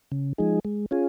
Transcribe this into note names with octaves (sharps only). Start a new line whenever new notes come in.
C#3
F3 G#3 D#4 G#4
G#3
C#4 F4 G#4